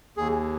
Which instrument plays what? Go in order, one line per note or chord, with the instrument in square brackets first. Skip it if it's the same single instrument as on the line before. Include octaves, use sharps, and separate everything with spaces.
[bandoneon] D#2 G#4